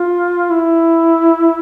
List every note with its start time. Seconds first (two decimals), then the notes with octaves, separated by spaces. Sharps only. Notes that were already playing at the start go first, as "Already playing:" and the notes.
Already playing: F4
0.51 E4